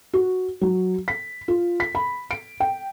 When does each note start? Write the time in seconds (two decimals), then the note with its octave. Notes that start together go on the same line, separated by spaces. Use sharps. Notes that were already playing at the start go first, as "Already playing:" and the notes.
0.14 F#4
0.61 F#3
1.08 B6
1.48 F4
1.80 B6
1.95 B5
2.31 D7
2.60 G5